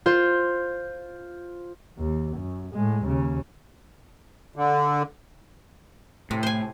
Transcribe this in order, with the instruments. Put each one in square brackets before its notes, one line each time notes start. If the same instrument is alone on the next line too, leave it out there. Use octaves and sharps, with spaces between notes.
[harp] F4 C5
[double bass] D#2
F#2
A2 G#3
D#2 C#3
[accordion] D3
[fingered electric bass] A2 [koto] C3
[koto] C5 G#5